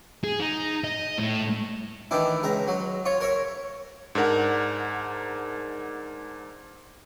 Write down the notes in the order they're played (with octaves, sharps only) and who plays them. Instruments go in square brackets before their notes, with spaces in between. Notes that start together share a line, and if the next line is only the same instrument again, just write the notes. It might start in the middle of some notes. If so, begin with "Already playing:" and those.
[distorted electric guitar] G#4
D#4
D#5
A2
[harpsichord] D#3 E3 D4 E4
C#2 E5 A#5
F#3
F4 C#5
A#4 C#5 E5
[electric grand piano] G#2 D4 A#4 F#5